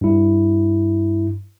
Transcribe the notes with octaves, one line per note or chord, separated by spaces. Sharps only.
G2 E4